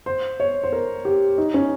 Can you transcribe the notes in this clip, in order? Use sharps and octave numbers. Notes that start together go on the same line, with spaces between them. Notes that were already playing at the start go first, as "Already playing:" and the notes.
C5
C#5
C5
A#4
G4
D#4
C#4